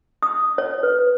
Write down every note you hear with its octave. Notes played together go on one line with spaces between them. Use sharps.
D#6
C#5
B4